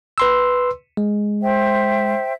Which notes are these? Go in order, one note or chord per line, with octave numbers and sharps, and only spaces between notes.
B4 C6 E6
G#3
C5 E5 G5